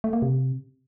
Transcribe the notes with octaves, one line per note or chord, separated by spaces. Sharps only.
A3
A#3
C3